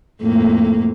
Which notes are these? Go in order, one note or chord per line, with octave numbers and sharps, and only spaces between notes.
F2 A2 A#3